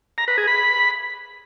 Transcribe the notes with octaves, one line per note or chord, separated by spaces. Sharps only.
A#5
B4
G#4
B5